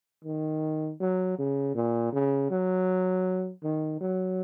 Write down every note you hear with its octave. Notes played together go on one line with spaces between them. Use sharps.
D#3
F#3
C#3
A#2
C#3
F#3
D#3
F#3